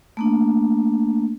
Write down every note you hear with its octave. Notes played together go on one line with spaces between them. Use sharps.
A3 A#3 D4